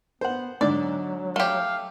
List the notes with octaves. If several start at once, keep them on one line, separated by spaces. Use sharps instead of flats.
B3 C5 F#5
G#2 D3 F#3 D5
A3 G4 F5